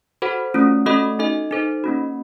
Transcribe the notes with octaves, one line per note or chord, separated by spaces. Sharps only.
F#4 A4 C5 F#5
A3 C#4 F4
A3 C#4 F#4 A4 D#5
D#4 A4 D#5
D#4 A4 C5
A#3 C#4 F#4